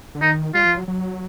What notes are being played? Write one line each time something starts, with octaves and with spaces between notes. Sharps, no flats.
D3
D#3 D#4
G3 F4
F3
F#3
F#3